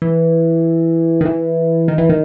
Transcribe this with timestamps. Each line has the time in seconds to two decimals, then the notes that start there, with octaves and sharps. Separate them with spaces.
0.02 E3
1.21 D#3
1.25 E3
1.88 D#3
1.98 E3
2.09 D#3